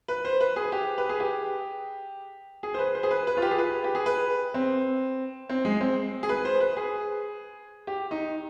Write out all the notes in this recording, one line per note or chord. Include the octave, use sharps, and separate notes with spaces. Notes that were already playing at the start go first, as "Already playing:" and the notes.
B4
C5
B4
G#4
G4
B4
G#4
G4
G#4
C5
B4
C5
G#4
B4
B4
F4
G4
G#4
B4
G4
G#4
B4
C4
C4
G#3
C4
G#4
B4
C5
B4
G#4
G4
D#4